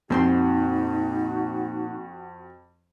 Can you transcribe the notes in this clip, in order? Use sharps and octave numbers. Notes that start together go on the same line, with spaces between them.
F2 A#2 C4 D#4 F#4 C6